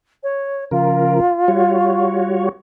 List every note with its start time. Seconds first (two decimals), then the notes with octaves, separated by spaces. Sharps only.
0.23 C#5
0.71 C#3 F3 F4 A#4
1.48 G3 F#4 C#5